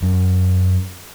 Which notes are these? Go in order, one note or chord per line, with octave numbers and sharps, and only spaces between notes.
F#2